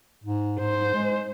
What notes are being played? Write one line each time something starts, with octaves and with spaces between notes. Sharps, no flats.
G#2
G#2 C5
G#3